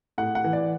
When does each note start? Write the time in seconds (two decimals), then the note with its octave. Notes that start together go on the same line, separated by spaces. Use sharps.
0.18 A2 F#5
0.35 F#5
0.44 E3
0.53 D5